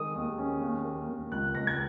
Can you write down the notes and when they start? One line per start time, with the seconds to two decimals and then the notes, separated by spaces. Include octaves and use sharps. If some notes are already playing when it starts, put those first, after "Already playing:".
Already playing: D#3 G#3 D#6
0.15 D#2
0.38 C#4
0.62 D#2
0.85 A#3
1.09 D#2
1.32 C#2 F#6
1.55 C#2 A#6
1.67 G#6